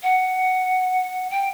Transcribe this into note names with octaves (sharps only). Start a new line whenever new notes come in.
F#5
G5